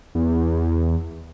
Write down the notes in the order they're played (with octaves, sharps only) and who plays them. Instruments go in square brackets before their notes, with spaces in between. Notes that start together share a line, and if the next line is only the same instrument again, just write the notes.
[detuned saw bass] E2